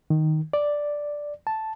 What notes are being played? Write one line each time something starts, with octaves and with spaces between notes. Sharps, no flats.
D#3
D5
A5